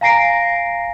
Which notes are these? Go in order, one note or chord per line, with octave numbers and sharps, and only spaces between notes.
F5 G#5 A#5 A#6 C7 D7